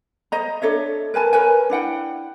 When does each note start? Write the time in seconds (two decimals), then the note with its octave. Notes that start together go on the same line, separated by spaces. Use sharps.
0.32 C5 D#5 A#5
0.62 D4 A4 C#5 E5
1.14 A#4 B4 G#5 A5
1.33 A#4 B4 C#5 G#5
1.70 D4 E4 F#5 G5